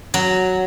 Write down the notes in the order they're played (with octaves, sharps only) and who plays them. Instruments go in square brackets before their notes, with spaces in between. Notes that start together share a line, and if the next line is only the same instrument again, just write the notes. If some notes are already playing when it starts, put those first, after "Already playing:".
[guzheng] F#3